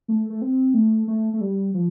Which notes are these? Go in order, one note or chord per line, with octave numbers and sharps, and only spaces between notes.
A3
A3
C4
A3
A3
A3
G3
F3